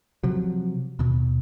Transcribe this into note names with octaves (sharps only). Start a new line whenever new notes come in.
C3 F3 F#3
D#2 B2